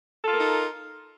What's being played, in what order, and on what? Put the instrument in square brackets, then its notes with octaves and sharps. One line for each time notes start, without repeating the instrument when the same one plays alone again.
[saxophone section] A4
F4
A#4
D#4